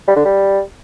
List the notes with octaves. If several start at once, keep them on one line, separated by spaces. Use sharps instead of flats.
G3
D3
G3